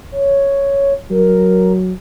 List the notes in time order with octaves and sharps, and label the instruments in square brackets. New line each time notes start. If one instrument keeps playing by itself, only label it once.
[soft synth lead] C#5
[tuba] F#3 [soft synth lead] A#4